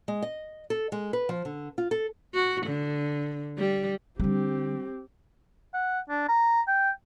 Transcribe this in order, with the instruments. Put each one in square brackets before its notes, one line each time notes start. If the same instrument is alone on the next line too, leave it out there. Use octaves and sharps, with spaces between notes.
[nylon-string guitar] G#3
D#5
A4
G#3
B4
F3
D3
F4
A4
[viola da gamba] F#4
D3
G3
[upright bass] D3 G3 [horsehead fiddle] C4 G4
[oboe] F#5
D4
A#5
G5